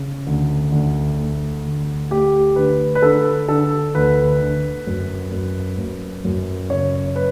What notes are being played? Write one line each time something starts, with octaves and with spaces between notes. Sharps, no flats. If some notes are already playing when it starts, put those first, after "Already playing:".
Already playing: C#3
D2
D2
A3
D2
A3 G4
D3 B4
B4
D3 A4
D3 A4
D2 B4
D3
F#2
F#2
F#2
F#2
C#3 C#5
B4